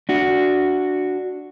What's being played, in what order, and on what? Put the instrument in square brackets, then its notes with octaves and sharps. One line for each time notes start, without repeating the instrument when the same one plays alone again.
[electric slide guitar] D4 F#4